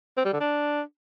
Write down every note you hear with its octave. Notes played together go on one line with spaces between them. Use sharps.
C4
G3
D3
D4